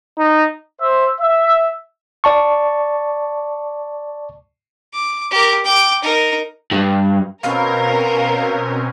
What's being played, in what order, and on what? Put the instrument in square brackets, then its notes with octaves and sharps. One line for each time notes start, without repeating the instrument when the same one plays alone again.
[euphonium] D#4
[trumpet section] C5 E5
E5
[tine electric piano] D5 A5 C#6
[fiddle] D6
G4 A#4
G5 D6
D#4 A#4
[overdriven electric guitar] G2
[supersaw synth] B2 C4 C#4 [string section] A#4 [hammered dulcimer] B4 D#5 [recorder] F5